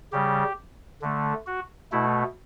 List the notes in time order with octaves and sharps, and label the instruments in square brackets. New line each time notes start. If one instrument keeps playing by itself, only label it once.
[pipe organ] C#3 G3 G4
D3 A3
F#4
B2 A3 E4